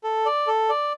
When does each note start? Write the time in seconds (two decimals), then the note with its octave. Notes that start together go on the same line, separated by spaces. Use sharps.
0.04 A4
0.26 D5
0.47 A4
0.69 D5